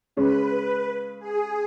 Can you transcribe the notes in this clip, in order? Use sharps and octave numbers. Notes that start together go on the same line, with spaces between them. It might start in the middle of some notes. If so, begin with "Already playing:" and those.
C#3 G#3 C#4 B4
G#4